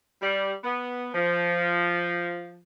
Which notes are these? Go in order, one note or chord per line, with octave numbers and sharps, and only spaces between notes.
G3
B3
F3